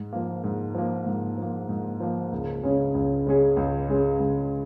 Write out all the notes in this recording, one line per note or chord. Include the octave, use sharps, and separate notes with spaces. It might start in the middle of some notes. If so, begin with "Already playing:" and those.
Already playing: G#2
F3 A#3
G#2
F3 A#3
G#2
F3 A#3
G#2
F3 A#3
C#2
C#3 G#3 C#4 G#4
C#2
C#3 G#3 C#4 G#4
C#2
C#3 G#3 C#4 G#4
C#2